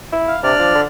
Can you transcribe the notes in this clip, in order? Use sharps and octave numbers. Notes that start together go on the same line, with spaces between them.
E4
F5
C3 D4 D5 F6
F3
D3